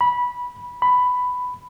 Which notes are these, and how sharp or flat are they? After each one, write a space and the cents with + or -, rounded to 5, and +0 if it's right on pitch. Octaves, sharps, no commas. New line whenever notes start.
B5 -15
B5 +10